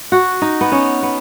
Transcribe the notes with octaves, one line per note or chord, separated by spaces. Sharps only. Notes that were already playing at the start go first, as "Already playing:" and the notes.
F#4
D#4
B3
C#4
B3